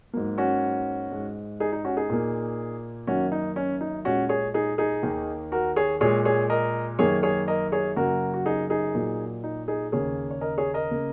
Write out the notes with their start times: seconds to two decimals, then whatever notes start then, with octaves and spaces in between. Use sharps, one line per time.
0.13 G#2 F#3 A#3
0.38 C#4 F#4
1.11 G#2 G#3
1.60 D#4 G#4
1.72 D#4
1.85 C#4 F#4
1.97 D#4 G#4
2.10 A#2 A#3
3.07 F#2 D#3 A#3 C#4 F#4
3.32 D#4
3.56 C#4
3.81 D#4
4.05 A#2 G#3 C#4 F#4
4.29 G#4 C#5
4.54 D#4 G#4
4.78 D#4 G#4
5.03 D#2 D#3 A#3
5.52 F#4 A#4
5.76 G#4 C#5
6.01 A#2 G#3 G#4 C#5
6.25 G#4 C#5
6.50 A#4 D#5
6.99 F#2 D#3 A#3 G#4 C#5
7.23 G#4 C#5
7.48 A#4 D#5
7.72 G#4 C#5
7.96 F#2 C#3 F#3 A#3 F#4 A#4
8.34 F#4
8.46 D#4 G#4
8.70 D#4 G#4
8.95 A#2 F#3 A#3
9.44 D#4
9.68 D#4 G#4
9.92 D#2 C#3 A#3 G#4 C#5
10.31 C#5
10.41 A#4 D#5
10.58 G#4 C#5
10.74 A#4 D#5
10.91 C#3 A#3